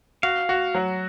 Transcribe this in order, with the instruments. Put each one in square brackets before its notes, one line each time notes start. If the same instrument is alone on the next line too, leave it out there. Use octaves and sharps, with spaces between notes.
[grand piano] F#4 [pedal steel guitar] F5
[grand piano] F#4
F#3